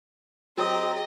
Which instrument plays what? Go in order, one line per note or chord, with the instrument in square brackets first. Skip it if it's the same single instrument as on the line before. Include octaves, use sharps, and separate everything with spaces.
[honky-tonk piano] F#3 D#6 [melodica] C4 [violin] G4 D#5 [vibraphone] G#4 G5 A#5